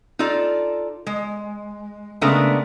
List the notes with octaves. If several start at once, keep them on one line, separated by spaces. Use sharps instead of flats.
D#4 F4 A4 D5
G#3
C#3 G#3 A3 B3 D4 A#4